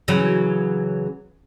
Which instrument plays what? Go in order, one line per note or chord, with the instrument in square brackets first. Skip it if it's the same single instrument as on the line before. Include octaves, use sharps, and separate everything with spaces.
[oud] C#3 E3 F#3